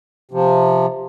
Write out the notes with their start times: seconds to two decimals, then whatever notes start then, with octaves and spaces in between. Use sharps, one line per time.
0.31 C3 F3